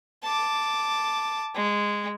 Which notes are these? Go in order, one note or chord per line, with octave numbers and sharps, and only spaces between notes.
A5 D6
G#3